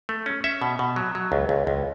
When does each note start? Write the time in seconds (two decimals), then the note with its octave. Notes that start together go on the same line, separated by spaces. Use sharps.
0.09 A3
0.26 C#4
0.44 C#4 E5
0.62 B2
0.79 B2
0.96 F#3
1.15 F#3
1.32 C#2
1.49 C#2
1.67 C#2